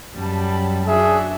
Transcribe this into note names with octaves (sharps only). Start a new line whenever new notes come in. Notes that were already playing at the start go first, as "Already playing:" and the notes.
F#2 G3 A5 B5
D4 F#4 G#4 E5